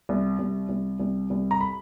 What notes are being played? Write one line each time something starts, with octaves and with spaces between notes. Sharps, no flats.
C2
C2
C2
C2
C2
A#5
B5